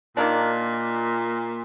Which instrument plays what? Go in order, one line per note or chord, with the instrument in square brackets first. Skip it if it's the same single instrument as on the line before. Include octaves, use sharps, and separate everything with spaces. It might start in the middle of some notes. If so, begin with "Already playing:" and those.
[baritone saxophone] A#2 [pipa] D#3 A#3 D4